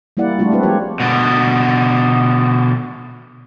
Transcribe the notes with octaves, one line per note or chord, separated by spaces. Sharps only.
G3 A#3 E4 D5 F#5
F3 G3 A3 D4 F4 F#4
G#3 C4 D4 F#4 B4
F3 G#3 F4 G4 A#4 C#5
B2 D3